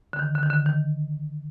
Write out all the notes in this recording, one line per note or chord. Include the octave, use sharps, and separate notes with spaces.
D3
D#3
D3
D#3
D3
D#3